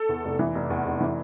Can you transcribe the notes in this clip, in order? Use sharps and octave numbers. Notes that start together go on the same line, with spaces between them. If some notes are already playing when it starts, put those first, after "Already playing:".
Already playing: A4
E2
F1
E3
F1
E2
F1
E3